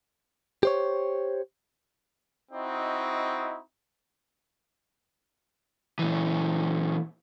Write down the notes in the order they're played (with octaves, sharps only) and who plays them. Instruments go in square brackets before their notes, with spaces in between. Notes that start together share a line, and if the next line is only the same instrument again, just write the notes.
[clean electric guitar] G4 C5 C#5
[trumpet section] C4 D#4 E4 F#4 D#5
[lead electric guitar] A#2 E3